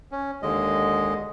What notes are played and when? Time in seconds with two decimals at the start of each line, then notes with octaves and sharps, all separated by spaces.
0.12 C#4
0.43 D#2 D3 G#3 D#5